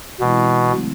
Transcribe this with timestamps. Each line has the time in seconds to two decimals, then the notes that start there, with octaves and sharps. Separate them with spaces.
0.20 B2 E3 G#3 C4 E4
0.70 C#3 F#3 A3 C4